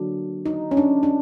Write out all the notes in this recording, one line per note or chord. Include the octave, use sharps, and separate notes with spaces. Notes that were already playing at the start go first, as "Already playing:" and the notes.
Already playing: D3 F#3 A#3 D4
D#4
C#4
D4
D4